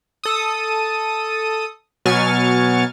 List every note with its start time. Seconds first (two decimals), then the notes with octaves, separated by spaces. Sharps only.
0.24 A4 D#6
2.05 B2 F#3 G#5 C#6 F6 A6